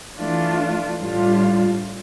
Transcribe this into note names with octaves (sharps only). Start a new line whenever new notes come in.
E3 A3 D4 F4
A2 G3 D4 F4